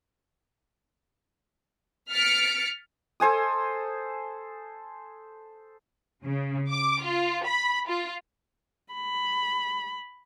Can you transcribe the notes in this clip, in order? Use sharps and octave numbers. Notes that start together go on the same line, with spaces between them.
F6 A6 B6 C#7 D7
A4 C5 G#5 D#6
C#3
D6
F4
B5
F4
B5